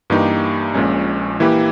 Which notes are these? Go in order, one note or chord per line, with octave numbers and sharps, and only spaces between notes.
G2 E3 A#3 D#4 G4
A#1 A#2 G#3 C#4
E3 A#3 E4 G4 B4